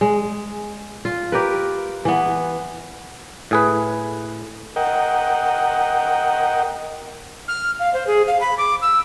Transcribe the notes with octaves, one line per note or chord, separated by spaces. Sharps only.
G#3
F4
G4 A#4 B4
E3 B3
A2 G#4 B4
A#4 D#5 F#5 G5
F6
F5
C5
G#4
F5
B5
D6
E6